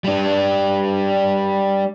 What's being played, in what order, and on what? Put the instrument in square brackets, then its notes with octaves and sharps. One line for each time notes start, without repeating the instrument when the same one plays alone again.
[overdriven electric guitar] G3 D4